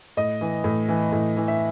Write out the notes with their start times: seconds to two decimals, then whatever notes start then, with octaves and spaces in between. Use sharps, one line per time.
0.17 A2 D#5
0.41 E3
0.64 A2
0.89 E3
1.12 A2
1.37 E3
1.48 E5